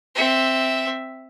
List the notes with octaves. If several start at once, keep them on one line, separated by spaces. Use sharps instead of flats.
C4 E5